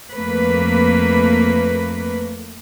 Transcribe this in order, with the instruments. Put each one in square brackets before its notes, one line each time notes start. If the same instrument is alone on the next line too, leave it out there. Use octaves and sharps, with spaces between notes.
[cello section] F2 A3 A#3 B4